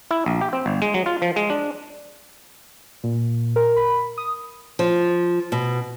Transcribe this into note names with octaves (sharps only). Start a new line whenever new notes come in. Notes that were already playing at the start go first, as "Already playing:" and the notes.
E4
A#1
G4
C4
G1
G#3
F#3
F4
F3
G#3
D4
A#2
A#4
B5
D#6
F3
B2